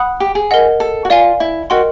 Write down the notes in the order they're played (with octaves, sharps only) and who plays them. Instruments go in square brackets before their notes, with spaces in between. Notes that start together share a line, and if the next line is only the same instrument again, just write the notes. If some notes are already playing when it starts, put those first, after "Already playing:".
Already playing: [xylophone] F#5 B5 D#6 F#6
[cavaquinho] G4
G#4
[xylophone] A#4 D#5 F#5
[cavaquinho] A4
F#4
[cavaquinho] F4 [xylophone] D5 F5 G#5
[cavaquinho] E4
[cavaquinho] F#4 [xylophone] A#4 D#5 G5 C6